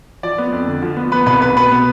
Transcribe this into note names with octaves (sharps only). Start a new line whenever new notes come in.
F3 D5
B3
F2
D3
F3
B3
B3 B4
C2 B4
C2 B4
B2 B4
B3